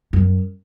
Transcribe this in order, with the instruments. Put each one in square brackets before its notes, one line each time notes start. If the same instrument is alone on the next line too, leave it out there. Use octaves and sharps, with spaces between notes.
[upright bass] F#2